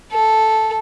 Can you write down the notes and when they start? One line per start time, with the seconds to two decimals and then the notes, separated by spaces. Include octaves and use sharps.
0.12 A4